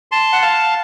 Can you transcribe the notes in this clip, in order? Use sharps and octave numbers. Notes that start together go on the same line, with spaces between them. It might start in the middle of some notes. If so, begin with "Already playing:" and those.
A5 C6
F#5
F5 A5